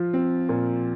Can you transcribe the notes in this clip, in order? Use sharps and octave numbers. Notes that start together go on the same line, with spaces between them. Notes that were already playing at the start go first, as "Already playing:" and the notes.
Already playing: F3 F4
C4
A#2